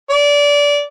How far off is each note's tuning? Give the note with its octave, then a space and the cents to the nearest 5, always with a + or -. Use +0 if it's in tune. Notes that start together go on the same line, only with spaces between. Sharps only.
D5 -20